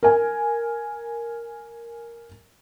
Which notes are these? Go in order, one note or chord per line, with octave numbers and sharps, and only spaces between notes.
A#4 G#5